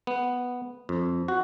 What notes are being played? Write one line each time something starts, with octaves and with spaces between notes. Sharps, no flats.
B3
F2
F#4